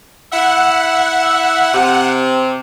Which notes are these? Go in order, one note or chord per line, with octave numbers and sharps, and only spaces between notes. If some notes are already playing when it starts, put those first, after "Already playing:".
E4 E5 F#5
C3